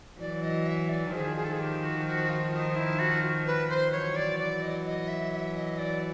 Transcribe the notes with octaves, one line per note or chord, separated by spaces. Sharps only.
E3 F#3 D5
D#5
E5
D5
D#3 F3 G#4
G#4
A4
G#4
G4
F#4
F#4
F4
D#4
E4
F#4
B4
C5
E3 F#3 C#5
D5
D5
D#5
D#5
E5
E5
D#5
D5